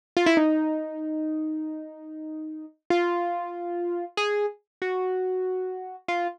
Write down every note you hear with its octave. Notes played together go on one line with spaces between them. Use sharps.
F4
E4
D#4
F4
G#4
F#4
F4